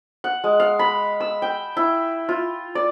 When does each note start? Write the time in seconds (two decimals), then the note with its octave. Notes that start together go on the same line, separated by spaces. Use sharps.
0.24 F#5
0.44 G#3
0.60 F5
0.79 B5
1.20 E6
1.42 G5
1.77 E4
2.29 F4
2.75 D5